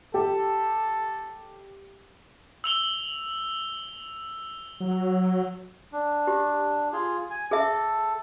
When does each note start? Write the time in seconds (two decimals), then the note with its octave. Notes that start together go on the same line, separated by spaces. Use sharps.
0.14 G4 A4
2.64 E6 F7 G7
4.80 F#3
5.93 D4
6.27 G4
6.93 F4 G#4
7.30 G#5
7.51 G#4 A4 E5